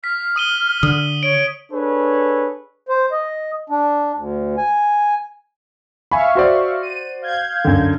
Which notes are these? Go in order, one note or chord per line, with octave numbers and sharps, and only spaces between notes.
F6 B6
D#6 D#7 G7
D3 D#6
C#5 D7
D4 G#4 A4 B4 C#5
C5
D#5
D4
D2
G#5
E5 F5 G#5 B5 C#6
F#4 C5 D5
D#7
F5 G6 G#6
F#2 D3